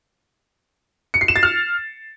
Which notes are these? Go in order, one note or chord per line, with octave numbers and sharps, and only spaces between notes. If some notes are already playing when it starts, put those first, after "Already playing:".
C#7
C7
E7
A6
F6